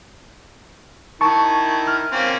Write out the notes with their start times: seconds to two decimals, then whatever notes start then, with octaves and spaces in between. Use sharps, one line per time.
1.21 D#3 E4 A5 C#6
1.88 F6
2.12 A#3 C4 C#4